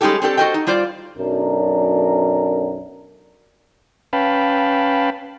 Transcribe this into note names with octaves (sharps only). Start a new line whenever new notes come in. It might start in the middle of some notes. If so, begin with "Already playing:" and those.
G3 G#3 C#4 D#4 G4 A4
C4 D4 G4 A4
F#4 A4 A#4 C5 D#5 G5
D#4
G3 F4 C5 D5
B1 F#2 D4 A#4
C#4 B4 F5 G5 A5 B5